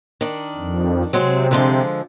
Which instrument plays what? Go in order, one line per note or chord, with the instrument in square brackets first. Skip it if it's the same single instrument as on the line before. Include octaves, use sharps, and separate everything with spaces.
[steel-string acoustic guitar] D#3 D4
[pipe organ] F2
[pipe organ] C3 [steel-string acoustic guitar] F#3 G#3 C4
[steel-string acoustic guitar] D3 F3 G#3